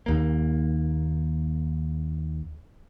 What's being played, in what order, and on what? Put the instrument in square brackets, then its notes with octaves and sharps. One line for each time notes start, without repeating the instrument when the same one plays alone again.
[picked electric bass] D#2 A#3